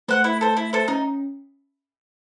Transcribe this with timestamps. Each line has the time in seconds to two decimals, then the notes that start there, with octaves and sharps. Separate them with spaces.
0.08 A3 C5 F#5
0.24 E4
0.41 A4 C5
0.57 E4
0.73 A4 C5
0.88 C#4 D#4